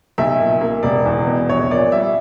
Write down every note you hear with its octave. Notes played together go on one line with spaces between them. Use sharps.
B1 E5
A#2
A#3
E1 D5
E2
B2
A#1 C#5
A#2 D5
G3 E5